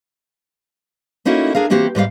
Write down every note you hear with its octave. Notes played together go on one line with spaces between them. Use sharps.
A3 A#3 C#4 D#4 E4 F#4
D4 G#4 A#4 F5
E3 A#3 C4 F#4 G4
G#2 G3 C5 F5